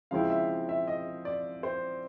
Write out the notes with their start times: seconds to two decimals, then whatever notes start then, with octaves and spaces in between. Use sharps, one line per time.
0.11 C#3 F3 G#3 C4 E4 F5
0.30 E5
0.69 E5
0.88 D#5
1.25 D5
1.63 C5